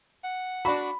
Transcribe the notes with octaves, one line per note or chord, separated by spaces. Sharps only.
F#5
D4 F#4 B5